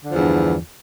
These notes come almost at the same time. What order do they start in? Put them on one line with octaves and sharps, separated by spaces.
D3 F3 E2 G2